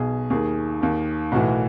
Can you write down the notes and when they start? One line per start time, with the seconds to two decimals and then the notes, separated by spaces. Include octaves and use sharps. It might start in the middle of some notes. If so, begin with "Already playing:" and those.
Already playing: B1 B2 G#4
0.30 D#2 D#3 G#4
0.81 D#2 D#3
1.32 B1 A2 E3 F#4